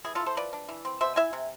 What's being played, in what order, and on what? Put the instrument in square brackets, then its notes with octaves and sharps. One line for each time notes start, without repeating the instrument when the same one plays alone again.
[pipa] E3 E4 G#4
F4 A4
E4
A4 C5
F3 B4 D5
D4
E3
C4
B2 C5 E5
E4 E5 G#5
C3